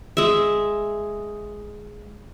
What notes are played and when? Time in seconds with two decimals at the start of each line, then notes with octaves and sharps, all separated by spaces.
0.17 G#3 E5